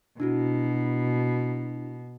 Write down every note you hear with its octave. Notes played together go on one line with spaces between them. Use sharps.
B2 D4 E4 F#4